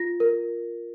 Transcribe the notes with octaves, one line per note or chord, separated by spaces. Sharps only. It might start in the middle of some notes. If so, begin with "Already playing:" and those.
Already playing: F4 A#6
A#4